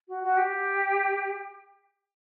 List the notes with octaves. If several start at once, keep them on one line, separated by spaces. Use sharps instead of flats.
F#4
F#4
G4